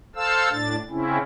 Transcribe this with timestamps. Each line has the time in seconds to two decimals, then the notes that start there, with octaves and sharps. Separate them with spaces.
0.16 A4 C5 F5 A5 E6
0.51 A2 D4 A6
0.90 C#3 C4 C#4 E4